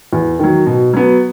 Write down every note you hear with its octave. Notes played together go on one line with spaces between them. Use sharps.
E2
D#3 F#3
B2
F#3 B3